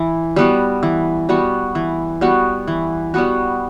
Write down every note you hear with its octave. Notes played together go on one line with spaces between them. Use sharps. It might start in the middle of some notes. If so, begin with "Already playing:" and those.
Already playing: E3
G3 B3 F#4
E3
G3 B3 F#4
E3
G3 B3 F#4
E3
G3 B3 F#4